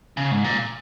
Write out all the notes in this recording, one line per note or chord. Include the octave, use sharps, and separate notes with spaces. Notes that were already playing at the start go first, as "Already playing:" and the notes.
C#3
G#2
A#2